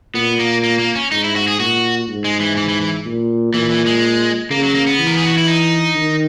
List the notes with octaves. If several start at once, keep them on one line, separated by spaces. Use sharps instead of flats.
A#2 B3
A#3
A#3
A#3
C#4
G#2 D#4
E4
F#4
G#4
A#2 F#4
G#2
G#3
E3
E3
E3
E3
A#2
A#2 E3
E3
G#3
C#3 A#3
F#3
A#3
B3
E3
A#4
G#4
F#4
E4
D#4
D#3